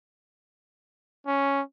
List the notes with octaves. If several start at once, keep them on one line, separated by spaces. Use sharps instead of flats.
C#4